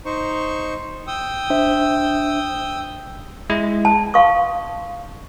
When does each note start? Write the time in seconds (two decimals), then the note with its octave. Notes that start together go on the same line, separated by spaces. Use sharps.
0.05 D#4 C5 C#6
1.07 G5 D#6 E6
1.50 D4 C5 E5
3.50 G#3 E4
3.85 A5
4.14 F5 C6 C#6 D#6